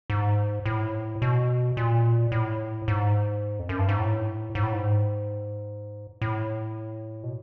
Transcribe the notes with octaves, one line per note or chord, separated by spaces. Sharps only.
G#2
A2
B2
A#2
A2
G#2
F2
F#2
G2
G#2
A2
G#2
A2
G#2
A2
B2